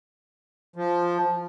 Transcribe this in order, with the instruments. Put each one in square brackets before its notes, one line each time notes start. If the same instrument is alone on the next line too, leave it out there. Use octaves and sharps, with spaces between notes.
[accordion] F3